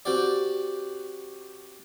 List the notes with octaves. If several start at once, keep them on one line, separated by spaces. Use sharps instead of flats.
C4 F#4 G4 D5